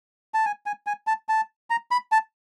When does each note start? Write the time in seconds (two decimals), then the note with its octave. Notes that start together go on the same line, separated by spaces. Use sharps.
0.34 A5
0.46 G#5
0.66 G#5
0.87 G#5
1.07 A5
1.29 A5
1.70 A#5
1.91 B5
2.12 A5